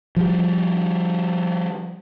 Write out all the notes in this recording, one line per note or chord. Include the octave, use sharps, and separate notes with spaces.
F3 G3